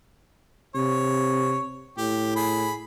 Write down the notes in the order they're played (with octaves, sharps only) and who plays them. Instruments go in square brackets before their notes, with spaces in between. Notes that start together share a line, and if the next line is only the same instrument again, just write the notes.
[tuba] C3 [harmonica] C#5
[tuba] A2 [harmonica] G4
[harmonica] G#4 B5